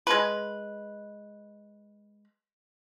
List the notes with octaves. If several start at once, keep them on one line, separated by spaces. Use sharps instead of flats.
G#3 B4